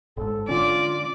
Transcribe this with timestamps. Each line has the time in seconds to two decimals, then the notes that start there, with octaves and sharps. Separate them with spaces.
0.17 G1 G#2 A4
0.49 D3 C#4 F4 D5